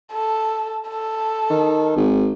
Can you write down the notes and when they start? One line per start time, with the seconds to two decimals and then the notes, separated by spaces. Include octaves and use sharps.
0.12 A4
0.89 A4
1.50 D#3
1.96 G#1